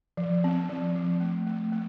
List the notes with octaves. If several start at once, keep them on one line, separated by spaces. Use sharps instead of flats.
F3
C4
F3
F3
A3
A3
A3